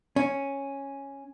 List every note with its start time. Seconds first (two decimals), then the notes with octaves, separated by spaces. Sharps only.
0.16 C#4